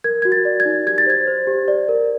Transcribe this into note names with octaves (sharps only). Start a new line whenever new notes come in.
A#4 G#6
F#4 G#6
A6
D5
G#6
D#4
G4 G#6
A6
C5 G#6
C5
G4
D5
A#4